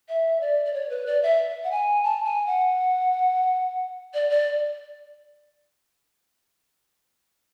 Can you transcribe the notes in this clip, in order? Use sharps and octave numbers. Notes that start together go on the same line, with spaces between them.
E5
D5
D5
C#5
B4
D5
E5
F#5
G#5
A5
G#5
F#5
D5
D5